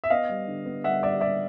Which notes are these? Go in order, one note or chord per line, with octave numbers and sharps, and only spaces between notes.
E5
B3 D#5 F5
G3
D3
B3
G3 E5 F#5
G3 D5 E5
G3 D5 E5